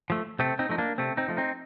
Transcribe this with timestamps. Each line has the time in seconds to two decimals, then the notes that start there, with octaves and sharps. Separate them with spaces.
0.10 F3 A3
0.39 C3 A3 C4
0.59 C4 D#4
0.69 F3 A3 D#4
0.78 A#3 D4
0.98 C3 A3 C4
1.17 C4 D#4
1.28 F3 A3
1.37 C4 D#4